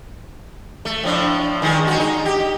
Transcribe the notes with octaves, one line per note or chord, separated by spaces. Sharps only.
A3
A2 F3 D4
D#3 E3 G#3
G#3 F#4
D#4
G4